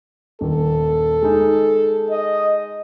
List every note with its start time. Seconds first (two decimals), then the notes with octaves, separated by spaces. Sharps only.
0.41 D#1 A4
1.22 G#3 D#4
2.11 D#5